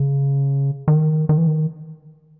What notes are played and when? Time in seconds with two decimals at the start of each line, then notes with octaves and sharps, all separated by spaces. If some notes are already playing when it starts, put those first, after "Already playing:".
Already playing: C#3
0.88 D#3
1.29 D#3
1.38 E3
1.47 D#3